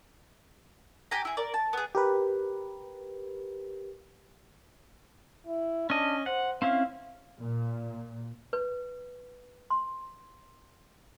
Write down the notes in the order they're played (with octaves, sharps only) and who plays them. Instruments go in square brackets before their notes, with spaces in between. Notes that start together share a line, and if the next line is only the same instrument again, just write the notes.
[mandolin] G4 G5 G#5 A#5
E4 G#4
A#4 D5
A5
B3 G#4
[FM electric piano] G4 A#4 B4
[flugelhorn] E4
[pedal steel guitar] C#4 D#5 [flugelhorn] D4
[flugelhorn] C5 [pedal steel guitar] F#5
[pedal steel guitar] C4 C#4 E4 [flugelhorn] F5
[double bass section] A#2
[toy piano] B4
C6